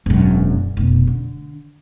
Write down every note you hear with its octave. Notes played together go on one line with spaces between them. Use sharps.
E1 F#2
F1 B2
D3